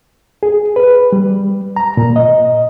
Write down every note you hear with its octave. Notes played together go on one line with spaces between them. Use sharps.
G#4
B4
G3
A#5
A#2
D#5